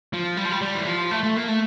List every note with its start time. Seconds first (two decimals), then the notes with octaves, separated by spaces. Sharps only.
0.13 F3
0.37 G3
0.45 F3
0.51 G3
0.61 G3
0.75 E3
0.87 F3
1.11 A3
1.23 A3
1.36 A#3
1.48 A3